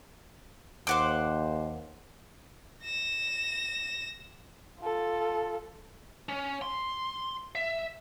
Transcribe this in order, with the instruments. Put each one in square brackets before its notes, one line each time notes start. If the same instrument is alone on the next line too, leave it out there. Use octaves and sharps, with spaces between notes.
[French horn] D#2 [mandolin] C5 F#5 D6
[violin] A#6 E7
[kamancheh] F4 A4
[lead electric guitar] C#4
C6
E5